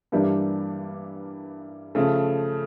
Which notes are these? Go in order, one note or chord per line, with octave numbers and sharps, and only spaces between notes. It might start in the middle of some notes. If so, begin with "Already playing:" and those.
G2 E3 G3 A#3 D4
C#3 F3 A3